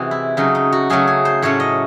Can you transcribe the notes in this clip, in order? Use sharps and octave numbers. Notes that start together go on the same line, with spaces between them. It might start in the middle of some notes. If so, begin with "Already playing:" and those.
Already playing: C3 E3 G#3 F#4
E4
C#3 F#3 A3 C#4 D#4
D#4
F#4
C#3 F#3 A3 C#4 G#4
G#4
C5
A2 F#3 A3 C#4 C#5
D#5